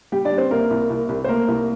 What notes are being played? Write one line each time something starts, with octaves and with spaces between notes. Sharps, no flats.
G3 G4 G5
D4 D5
G3
C4 C5
C3 A#3 A#4
C2
C2
C2
C5
A3 A#3 A#4
C2